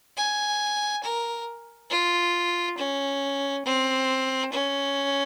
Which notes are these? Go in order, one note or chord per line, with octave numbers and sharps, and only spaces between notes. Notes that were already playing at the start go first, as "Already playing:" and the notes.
G#5
A#4
F4
C#4
C4
C#4